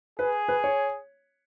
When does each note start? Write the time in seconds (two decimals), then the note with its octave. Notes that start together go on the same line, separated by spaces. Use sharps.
0.19 G#4 B4
0.48 B4
0.64 C#5